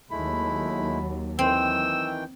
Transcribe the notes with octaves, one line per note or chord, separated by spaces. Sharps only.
D#2 F#3 G#3 A3 E4 B5
D#3 E3 C4 G5 E6